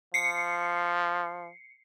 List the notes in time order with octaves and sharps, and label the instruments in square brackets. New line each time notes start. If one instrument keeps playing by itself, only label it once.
[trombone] F3 [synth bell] C7 C#7